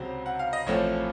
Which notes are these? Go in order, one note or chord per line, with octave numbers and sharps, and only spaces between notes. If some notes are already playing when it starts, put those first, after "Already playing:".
Already playing: C#2 C3 F#3 C4 C5
F#5
F5
D#5
A1 A2 F3 A3 C4 C#5